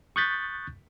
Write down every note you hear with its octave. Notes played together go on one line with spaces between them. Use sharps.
C#6 D#6 F#6 G6 A6 B6